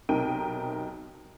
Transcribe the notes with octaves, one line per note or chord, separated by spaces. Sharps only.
B1 C3 D#4 A#4 G5 D#7